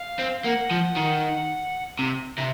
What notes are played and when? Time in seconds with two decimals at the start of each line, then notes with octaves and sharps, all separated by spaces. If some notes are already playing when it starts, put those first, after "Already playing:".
Already playing: F5
0.19 C4
0.44 A#3 F#5
0.71 F3
0.96 D#3
1.99 C3
2.38 C3